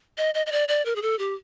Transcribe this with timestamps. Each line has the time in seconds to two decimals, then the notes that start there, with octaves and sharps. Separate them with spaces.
0.18 D#5
0.34 D#5
0.46 D#5
0.52 D5
0.68 D5
0.85 A#4
0.96 G#4
1.02 A4
1.19 G4